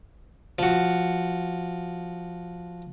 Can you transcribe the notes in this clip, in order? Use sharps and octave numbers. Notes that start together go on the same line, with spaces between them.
F3 F#4